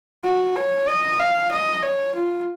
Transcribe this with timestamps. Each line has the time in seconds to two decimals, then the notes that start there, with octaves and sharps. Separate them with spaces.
0.24 F#4
0.56 C#5
0.88 D#5
1.19 F5
1.51 D#5
1.82 C#5
2.15 F4